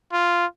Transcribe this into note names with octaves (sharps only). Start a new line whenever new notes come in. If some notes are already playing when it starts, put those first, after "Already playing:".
F4